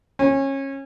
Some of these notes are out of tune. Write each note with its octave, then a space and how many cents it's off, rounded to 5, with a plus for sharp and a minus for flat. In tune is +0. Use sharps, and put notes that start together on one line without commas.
C#4 -25